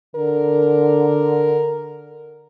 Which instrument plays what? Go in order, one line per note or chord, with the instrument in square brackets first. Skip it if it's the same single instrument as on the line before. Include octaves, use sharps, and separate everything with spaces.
[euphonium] D3 [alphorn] A#4